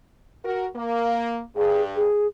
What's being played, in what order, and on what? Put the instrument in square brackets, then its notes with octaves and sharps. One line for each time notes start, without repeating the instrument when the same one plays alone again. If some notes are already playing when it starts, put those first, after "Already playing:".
[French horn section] F#4 A#4
A#3
[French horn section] G2 [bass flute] G#4
[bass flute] G#4